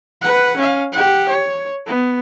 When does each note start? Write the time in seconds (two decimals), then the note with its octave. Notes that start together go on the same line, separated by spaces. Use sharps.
0.21 B4 F#5
0.57 C#4 F5
0.92 G4 F#5
1.28 C#5
1.87 B3